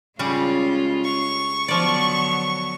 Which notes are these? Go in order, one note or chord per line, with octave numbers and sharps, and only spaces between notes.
C#3 G3 G#3 C#4 F4
C#6
D3 F3 F#3 B3 D5